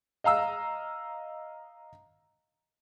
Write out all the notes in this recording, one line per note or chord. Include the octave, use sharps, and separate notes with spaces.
D#5 F5 A#5 E6